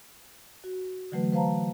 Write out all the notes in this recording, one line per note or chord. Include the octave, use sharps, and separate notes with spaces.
F#4
D3 E3 F#3 A3 B4
B4 C5 F5 A5 A#5